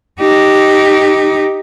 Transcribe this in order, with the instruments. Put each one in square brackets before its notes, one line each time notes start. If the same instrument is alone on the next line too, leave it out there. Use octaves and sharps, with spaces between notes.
[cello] D#4 G4